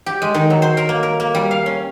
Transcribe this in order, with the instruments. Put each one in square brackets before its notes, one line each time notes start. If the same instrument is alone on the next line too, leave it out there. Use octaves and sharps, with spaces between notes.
[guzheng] G4
G#3
D#3
F#3
C5
A#4
A#3
A#4
A#3
G3
F5
C#4